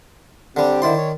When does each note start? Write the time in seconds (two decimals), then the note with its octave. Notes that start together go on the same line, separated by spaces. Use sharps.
0.56 D3 G3 C4 D4 G4
0.82 D3 D#3 E4 C5 D5 C6
0.97 C#5